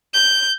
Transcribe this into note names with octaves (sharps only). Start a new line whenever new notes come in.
G6